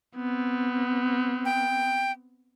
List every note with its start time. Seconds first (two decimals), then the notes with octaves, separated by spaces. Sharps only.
0.16 B3 C4
1.45 G5